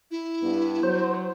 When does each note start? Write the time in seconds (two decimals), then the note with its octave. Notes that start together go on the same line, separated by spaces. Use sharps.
0.11 E4
0.43 G2 B3
0.83 F#3 C5